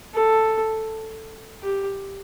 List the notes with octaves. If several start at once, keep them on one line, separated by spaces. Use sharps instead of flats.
A4
G4